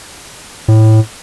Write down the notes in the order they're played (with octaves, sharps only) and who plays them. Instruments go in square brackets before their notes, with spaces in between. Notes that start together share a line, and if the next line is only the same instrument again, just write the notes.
[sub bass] A2